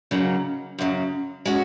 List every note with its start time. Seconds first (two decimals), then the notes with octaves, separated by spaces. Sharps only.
0.11 C#3 F#3 A#3 D#4
0.79 F#2 C#3 F#3
1.46 G#3 C#4 F#4